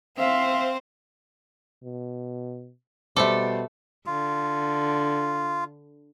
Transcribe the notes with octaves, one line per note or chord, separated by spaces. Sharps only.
C4 C5 E5 F5
B2
B2 G3 A3 A4 C5 D6
D3 F4